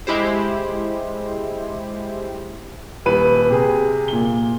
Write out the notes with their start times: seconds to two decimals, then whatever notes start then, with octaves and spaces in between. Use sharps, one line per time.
0.07 G#3 E4 G4 C5
3.06 D#1 B4 D#7
3.50 C3 G#4
4.08 A#2 G7